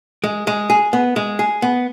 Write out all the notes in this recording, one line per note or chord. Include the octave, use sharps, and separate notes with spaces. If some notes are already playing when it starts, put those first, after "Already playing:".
G#3
G#3
G#4
B3
G#3
G#4
B3